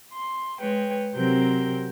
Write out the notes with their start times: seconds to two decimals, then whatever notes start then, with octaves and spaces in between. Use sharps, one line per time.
0.13 C6
0.60 G#3 B4 C#5 G5
1.15 C3 F#3 C4 G4 A#4 G6